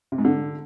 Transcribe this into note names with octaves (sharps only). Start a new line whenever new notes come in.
C3
G#2
D3